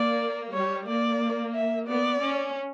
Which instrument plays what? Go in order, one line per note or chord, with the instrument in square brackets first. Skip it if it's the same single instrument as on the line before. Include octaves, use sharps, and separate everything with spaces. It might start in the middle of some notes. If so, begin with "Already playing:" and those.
Already playing: [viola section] A#3 [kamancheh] D5
[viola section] G3 [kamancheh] C#5
[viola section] A#3 [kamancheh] D5
[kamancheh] E5
[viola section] B3 [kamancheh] D5
[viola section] C#4